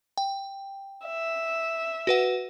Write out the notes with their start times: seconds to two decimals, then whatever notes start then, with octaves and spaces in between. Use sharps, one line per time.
0.17 G5
1.07 E5
2.07 F#4 B4 F#5